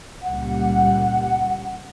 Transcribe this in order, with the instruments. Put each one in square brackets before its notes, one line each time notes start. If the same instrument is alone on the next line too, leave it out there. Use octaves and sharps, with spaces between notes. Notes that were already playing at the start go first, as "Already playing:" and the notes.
[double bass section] C#2 A#2 G3 [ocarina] F#5